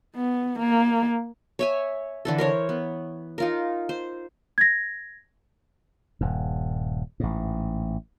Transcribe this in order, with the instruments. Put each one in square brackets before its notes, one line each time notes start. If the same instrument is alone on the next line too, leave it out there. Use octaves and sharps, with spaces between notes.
[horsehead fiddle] B3
A#3
[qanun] C#5 E5 G#5
D3 E3 A4
A#4 C5 C#5
B3
D#4 F4 A#4
C5
[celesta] G#6 A#6
[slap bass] D#1 G2
A1 G#2